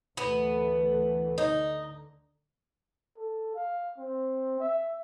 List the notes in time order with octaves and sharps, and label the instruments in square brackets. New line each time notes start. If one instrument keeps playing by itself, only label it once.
[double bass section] D2 E3 A3 [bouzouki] B3
[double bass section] D3 [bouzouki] D#4
[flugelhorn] A4
F5
C4
E5